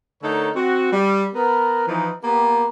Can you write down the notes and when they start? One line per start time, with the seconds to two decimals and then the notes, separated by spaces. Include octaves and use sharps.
0.22 D3 A3 D#4 A4 A#4 C#5
0.55 C4 F#4
0.92 G3
1.34 B3 A#4
1.87 E3 F3 D#4
2.22 A#3 B3 G4